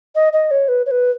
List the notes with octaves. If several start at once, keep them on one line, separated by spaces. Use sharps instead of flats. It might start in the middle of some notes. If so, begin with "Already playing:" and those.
D#5
D#5
C#5
B4
C#5
B4